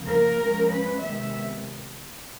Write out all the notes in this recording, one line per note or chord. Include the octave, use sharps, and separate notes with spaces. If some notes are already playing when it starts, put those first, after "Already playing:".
Already playing: C#3 F3 A#3
A#4
F3 G#3 C#4
B4
C3 D#3 G#3 B3 E5